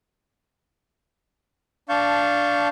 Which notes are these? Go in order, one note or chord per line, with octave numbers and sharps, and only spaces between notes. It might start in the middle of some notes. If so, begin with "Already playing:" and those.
D4 F5 A5 C#6 G6